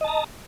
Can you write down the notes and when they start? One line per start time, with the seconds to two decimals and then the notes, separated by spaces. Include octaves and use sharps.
0.01 D#5
0.04 A5
0.08 A#5